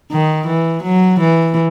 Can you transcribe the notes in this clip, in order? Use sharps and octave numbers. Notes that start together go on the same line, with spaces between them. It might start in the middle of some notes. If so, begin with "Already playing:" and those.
D#3
E3
F#3
E3